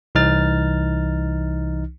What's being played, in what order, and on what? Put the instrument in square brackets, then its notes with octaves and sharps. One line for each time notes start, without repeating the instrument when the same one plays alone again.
[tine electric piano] C2 E3 D#4 F6 A6